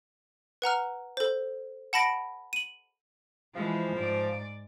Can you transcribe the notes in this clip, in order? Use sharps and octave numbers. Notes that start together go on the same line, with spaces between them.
B4 F#5 A#5 F6
A4 C5
F#5 A5 B5 A#6 D7
D#7 F#7
E3 F3 G#3
G#2 D5